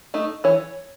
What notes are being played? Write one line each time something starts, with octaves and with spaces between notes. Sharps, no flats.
A3 D#4
E3 C#5